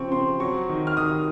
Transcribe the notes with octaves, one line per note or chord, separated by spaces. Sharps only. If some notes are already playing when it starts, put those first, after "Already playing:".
Already playing: C#3 F3 C4 C#6
C4 C6
F#3 C#6
D#3
F6
D#3 D#6